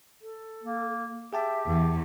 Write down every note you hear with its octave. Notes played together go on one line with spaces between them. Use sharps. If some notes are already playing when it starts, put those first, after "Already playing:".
A4
A#3
G4 G#4 E5 G5 A5
E2